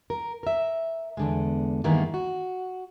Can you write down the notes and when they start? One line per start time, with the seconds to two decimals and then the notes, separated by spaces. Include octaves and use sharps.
0.10 A#4
0.43 A#4 E5
1.17 E2 D3 G#3
1.84 G2 D#3 E3 G#3 A#3 B3
2.14 F#4